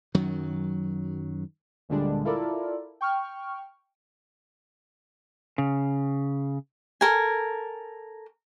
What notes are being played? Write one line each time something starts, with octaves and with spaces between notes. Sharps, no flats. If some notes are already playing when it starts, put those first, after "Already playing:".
F#2 D#3 F#3
D2 A#2 D3 G3 G#3 D4
E4 F4 A4 A#4 D5
G5 C#6 F6
C#3
A4 A#4 G#5